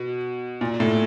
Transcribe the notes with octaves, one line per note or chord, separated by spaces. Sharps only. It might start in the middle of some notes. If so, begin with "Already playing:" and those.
Already playing: B2
A#2
A2